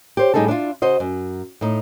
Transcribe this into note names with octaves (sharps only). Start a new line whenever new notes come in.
G4 C5 C#5
A2 G3 D#4 G#4 A4 A5
D4 E4 F4
C#3 F#4 C5 D#5
F#2
A2 D#4